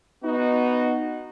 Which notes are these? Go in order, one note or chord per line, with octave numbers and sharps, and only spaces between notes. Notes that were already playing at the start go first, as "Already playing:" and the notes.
B3 D#4 F#4